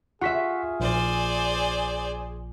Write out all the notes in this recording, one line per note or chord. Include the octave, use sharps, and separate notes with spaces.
F4 G#4 E5 F#5 C#6 B6
A#1 C5 D5 G#5